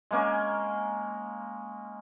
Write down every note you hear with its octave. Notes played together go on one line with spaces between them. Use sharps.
G#3 A#3 C#4